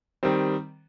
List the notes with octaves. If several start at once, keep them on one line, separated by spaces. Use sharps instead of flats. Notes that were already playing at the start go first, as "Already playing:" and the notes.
D#3 G3 C4